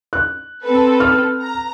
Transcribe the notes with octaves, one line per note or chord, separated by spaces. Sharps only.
F#6
C4 A4 B4
F6
A#5